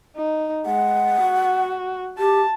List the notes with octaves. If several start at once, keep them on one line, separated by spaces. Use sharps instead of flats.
D#4
G#3 F#5
F#4
G4 A5